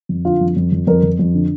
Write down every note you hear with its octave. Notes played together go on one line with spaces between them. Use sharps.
F2
D3 F4
F2
F2
F2
F2 A#4
F2
F2
D3